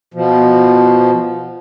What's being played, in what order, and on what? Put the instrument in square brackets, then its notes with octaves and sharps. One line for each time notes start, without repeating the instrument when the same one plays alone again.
[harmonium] B2 F3